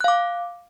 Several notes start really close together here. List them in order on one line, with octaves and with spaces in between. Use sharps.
F#6 F5 D6